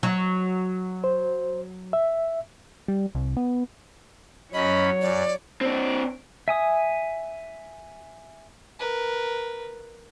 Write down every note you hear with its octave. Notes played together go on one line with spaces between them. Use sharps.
F#3
C5
E5
G3
C2
B3
F#2 F#3 C#4 C#5 D#5 B5
F#2 D5
C4 D4
E5 G#5 D#6
A#4 B4